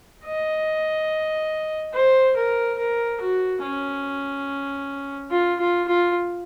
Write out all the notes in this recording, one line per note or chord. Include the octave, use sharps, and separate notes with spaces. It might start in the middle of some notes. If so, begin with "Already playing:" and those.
D#5
C5
A#4
A#4
F#4
C#4
F4
F4
F4